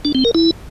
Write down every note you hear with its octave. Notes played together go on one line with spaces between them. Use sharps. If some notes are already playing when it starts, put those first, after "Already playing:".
D4
C4
A#4
E4